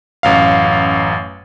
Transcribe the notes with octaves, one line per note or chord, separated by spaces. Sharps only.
A1 F#2 F5